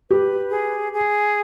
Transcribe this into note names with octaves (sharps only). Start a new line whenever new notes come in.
G4 B4
G#4
G#4